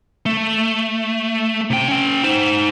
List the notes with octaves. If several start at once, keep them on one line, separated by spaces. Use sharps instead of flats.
A3
C3 G5
C#4 G5
D#4 C5